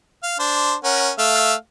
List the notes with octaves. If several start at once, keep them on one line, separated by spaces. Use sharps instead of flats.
F5
D4 C5
C#4 A#4 F#5
A3 E5 F5